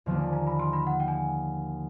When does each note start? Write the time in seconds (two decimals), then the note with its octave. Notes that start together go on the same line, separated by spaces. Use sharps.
0.06 D#2 D3 F3 A#3 D4 D5
0.19 G#5
0.33 A#5
0.47 B5
0.59 C6
0.73 B5
0.87 F#5
1.00 G5
1.08 G#5